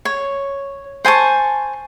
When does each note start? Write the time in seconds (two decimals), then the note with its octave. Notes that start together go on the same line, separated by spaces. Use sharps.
0.05 C#5
1.05 C5 G#5 A5 C#6